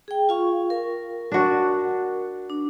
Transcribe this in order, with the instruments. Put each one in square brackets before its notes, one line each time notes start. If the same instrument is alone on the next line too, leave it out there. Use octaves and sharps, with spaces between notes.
[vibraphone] G#4 G5
F4 F5 C#6
A#4
[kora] D4 F#4
[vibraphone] D4